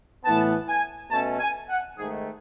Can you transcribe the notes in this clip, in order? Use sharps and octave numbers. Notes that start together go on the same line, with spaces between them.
A2 E3 B3 A5
G#5
B2 A3 C#4 A5
G#5
F#5
G#2 D#3 A3 G#4